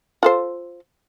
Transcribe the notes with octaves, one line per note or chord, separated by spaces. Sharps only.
F4 A4 C5